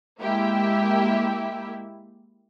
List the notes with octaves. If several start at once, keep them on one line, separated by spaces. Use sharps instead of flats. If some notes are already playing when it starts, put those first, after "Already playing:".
G#3 A#3 E4 G4 E5